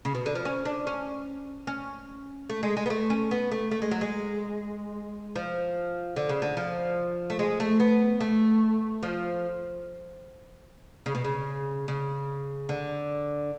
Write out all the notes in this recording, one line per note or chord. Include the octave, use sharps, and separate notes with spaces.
C#3
B2
D3
F3
C#4
D4
C#4
C#4
A3
G#3
G#3
B3
A3
C#4
B3
A3
A3
G#3
F#3
G#3
F3
D3
C#3
D3
F3
A3
G#3
A3
B3
A3
F3
C#3
B2
C#3
C#3
D3